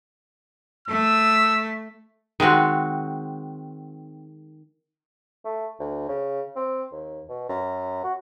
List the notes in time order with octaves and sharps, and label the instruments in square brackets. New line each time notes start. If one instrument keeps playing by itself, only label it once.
[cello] A3 [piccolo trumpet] E6
[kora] D#3 G#3 C4 F#4
[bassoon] A3
D2
C#3
C4
D#2
B2
F#2
F#4